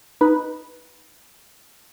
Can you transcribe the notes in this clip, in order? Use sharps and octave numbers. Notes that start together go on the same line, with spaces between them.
D#4 B4